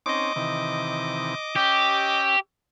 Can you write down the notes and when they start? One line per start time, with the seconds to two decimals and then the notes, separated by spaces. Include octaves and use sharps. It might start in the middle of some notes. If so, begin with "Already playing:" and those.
0.06 C4 C#4 D#4 D#5 D6
0.36 C3 D#3 E3
1.56 C#4 G4 E6